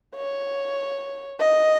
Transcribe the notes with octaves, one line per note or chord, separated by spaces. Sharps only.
C#5
D#5